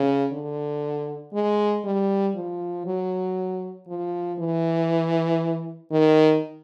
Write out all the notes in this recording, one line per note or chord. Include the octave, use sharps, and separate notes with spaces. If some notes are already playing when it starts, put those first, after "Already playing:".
Already playing: C#3
D3
G#3
G3
F3
F#3
F3
E3
D#3